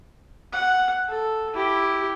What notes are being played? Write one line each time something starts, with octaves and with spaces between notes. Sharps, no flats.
F#5
A4
E4 G4